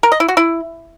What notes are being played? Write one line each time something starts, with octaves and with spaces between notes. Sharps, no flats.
A#4
D#5
E4
F#4
E4